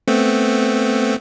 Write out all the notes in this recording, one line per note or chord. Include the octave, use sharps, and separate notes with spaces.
A3 B3 C4